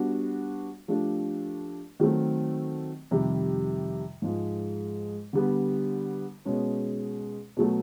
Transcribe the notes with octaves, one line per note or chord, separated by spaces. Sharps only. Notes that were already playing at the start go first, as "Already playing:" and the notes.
Already playing: G3 B3 D4 F#4
F3 A3 D4 G4
D#3 F#3 A3 C4
F2 C3 D#3 G3
G#2 F3 G#3
D3 G3 B3
B2 G#3 C#4
B2 F#3 A3